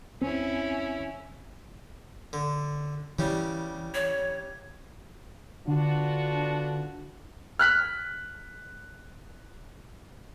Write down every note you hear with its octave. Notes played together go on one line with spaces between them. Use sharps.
E2 C4 C#4 E4
D3
C#3 E3 G3
C#5
D3 B3 D4 F4 F#4
F6 F#6 B6